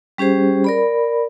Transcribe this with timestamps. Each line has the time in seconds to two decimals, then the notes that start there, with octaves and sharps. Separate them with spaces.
0.18 G3 C#4 G4 G#4 C5
0.64 A#4 D5 B5